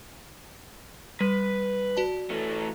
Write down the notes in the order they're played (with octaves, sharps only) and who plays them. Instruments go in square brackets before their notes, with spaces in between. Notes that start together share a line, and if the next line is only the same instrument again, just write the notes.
[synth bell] G3 B6 D#7 [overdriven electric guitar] B4
[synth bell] F#4 D5 A5
[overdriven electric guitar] E3 A3